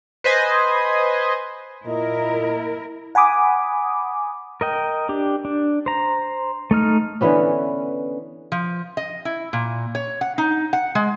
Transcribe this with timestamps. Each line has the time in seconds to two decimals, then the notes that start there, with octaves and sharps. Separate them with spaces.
0.24 B4 C5 D#5 G#5
1.86 A#2 E4 A#4 D#5
3.15 F#5 G#5 B5 D6 D#6
4.61 A#4 D#5 G5
5.09 D4 G4
5.45 D4
5.86 C5 A#5
6.71 A3 D#4 F6
7.21 D3 E3 B3 C#4
8.52 F3
8.97 D#5
9.25 E4
9.53 A#2
9.95 C#5
10.21 F#5
10.38 D#4
10.73 F#5
10.95 G#3